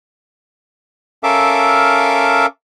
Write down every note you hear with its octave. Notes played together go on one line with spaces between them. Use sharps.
C#4 A4 A#4 E5 F5 D6